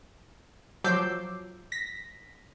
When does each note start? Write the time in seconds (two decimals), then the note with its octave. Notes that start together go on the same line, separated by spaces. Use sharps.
0.84 F3 F#3 D6 E6 G6 C7
1.72 A#6 B6